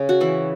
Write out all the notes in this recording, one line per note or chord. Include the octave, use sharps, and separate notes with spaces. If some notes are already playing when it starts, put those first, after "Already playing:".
Already playing: C#3
F#4
E3 E4